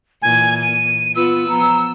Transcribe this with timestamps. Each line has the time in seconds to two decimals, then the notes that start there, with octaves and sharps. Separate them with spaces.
0.22 A#2 E3 G#5
0.62 D#7
1.16 B3 F4 B4 E6
1.49 F3 B3 A#5